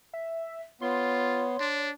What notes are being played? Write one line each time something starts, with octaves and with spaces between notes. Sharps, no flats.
E5
B3 F4 C#5 C6
D4